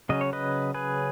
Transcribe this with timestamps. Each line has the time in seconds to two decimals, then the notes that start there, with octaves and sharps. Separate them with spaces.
0.09 C#3 F#3 C#4 D#5
0.21 C#5
0.33 B4 D#5
0.74 G#4 B4